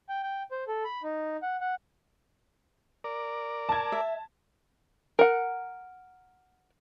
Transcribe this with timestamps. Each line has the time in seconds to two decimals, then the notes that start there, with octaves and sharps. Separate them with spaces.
0.09 G5
0.23 G5
0.51 C5
0.68 A4
0.84 B5
1.03 D#4
1.42 F#5
1.61 F#5
3.04 A#4 D5
3.69 A5 G#6
3.92 E5
5.19 A#4 F#5